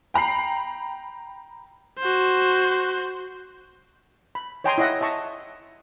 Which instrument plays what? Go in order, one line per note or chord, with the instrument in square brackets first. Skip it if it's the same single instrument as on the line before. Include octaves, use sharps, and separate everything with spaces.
[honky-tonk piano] G5 A#5 B5 C7
[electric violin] F#4 C5
[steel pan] B5
C#5 D#5 G5 G#5 A#5 C6
E4 C#5 D#5 E5 F#5
D#5 E5 A5 C#6